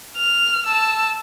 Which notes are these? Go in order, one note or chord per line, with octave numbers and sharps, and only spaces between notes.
F6
A5 E6